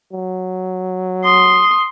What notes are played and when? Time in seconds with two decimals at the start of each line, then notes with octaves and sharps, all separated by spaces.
0.13 F#3
1.25 C6 D#6